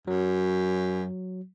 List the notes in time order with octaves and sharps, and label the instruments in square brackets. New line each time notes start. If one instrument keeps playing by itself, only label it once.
[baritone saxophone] F#2 [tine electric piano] F#3